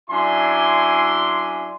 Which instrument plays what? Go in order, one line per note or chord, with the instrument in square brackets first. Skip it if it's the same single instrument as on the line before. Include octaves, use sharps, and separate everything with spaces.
[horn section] F#2 D4 E4 G#5 C6